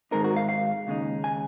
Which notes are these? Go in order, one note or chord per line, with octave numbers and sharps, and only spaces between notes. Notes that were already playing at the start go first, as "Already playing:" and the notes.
G#2 D#3 G#3 C4 D#4 A#4
F#4
F5
F5
D#2 C#3 G#3 D#4
G#5